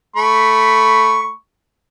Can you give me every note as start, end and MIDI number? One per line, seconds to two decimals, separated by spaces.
0.16 1.31 57
0.16 1.31 83
0.16 1.31 85